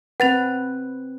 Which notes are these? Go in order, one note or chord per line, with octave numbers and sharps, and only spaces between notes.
C4 B4 F#5 A6 F7